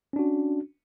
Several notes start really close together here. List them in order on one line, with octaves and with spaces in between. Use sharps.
C#4 D4 F#4